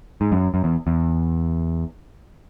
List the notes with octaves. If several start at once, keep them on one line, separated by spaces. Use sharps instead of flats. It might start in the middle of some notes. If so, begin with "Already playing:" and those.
G#2
F#2
F#2
E2
E2